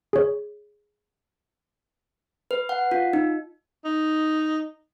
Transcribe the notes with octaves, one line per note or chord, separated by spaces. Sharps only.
G#4 C#5
B4
F#5
F4
D#4
D#4